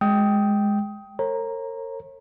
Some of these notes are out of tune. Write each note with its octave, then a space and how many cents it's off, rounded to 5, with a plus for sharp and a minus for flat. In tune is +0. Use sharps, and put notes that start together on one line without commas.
G#3 +0 G5 -5 D#6 +20
A#4 -40 C#5 -40 A#5 +0